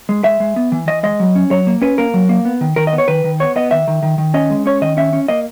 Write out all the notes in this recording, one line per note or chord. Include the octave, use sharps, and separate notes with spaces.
G#3
G#3 E5
G#3
B3
E3
E3 D#5
G#3 D#5
F#3
C#4
F#3 C#5
A#3
C#4 B4
A#3 A#4
F#3
A#3
B3
D#3
D#3 A#4
D#5
B3
C#5
D#3 B4
D#3
B3 C#5
B3 D#5
D#3 E5
D#3
D#3
D#3
C#4 D#5
G#3
C#4 C#5
D#3 D#5
C#4 E5
C#4
A#3 D#5